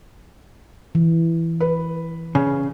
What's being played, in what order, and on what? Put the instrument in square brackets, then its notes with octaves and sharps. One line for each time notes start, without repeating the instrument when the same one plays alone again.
[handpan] E3
[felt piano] B4
[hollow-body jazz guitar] C#3